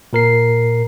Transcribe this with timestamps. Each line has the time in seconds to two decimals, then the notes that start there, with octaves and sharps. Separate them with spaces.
0.13 A#2 A#4 C7